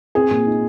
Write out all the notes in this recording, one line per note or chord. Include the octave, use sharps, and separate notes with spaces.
C4 G#4
A#2
D#4